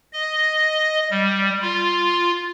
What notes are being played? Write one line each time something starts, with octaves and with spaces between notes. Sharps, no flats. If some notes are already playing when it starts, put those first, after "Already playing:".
D#5
G3
F4